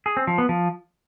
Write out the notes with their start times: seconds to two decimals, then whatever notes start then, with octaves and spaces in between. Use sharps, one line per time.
0.06 G#4
0.17 C4
0.27 F3
0.38 B3
0.49 F3